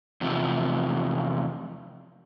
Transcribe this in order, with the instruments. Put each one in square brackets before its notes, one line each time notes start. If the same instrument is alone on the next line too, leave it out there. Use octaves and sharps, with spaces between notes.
[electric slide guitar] E2 C3 F3